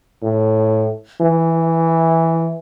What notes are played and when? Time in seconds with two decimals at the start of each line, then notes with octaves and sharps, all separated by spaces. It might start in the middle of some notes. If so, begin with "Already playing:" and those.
0.23 A2
1.21 E3